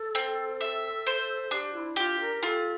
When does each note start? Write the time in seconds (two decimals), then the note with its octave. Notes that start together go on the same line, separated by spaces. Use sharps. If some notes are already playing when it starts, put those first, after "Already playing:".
Already playing: A4
0.15 C4
0.61 E5
1.07 C5
1.51 D4 G4
1.74 F4
1.78 E4
1.96 F4 G4
2.20 A#4
2.43 F4 A4